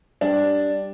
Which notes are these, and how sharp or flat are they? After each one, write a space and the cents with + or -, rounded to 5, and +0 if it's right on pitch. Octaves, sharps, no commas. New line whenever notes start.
G3 +0 D4 +0